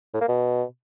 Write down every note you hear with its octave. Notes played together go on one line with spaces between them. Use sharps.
A2
A#3
B2